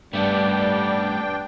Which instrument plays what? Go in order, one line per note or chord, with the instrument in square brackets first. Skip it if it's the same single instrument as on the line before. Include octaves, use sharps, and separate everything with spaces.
[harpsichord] G2 [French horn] G3 [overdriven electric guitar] A3 B3 [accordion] D4 G5